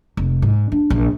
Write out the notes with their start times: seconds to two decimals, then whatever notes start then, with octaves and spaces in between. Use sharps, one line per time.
0.17 F1
0.42 G#2
0.72 D4
0.90 A#1